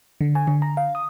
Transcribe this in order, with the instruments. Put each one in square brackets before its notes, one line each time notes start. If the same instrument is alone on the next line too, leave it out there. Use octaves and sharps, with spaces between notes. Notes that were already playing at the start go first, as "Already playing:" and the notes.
[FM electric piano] D3
G#5
D3
A#5
F5
D#6